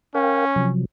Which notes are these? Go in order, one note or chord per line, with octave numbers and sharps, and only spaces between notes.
C#4 A#4 F5 G5
C3 F3 F#3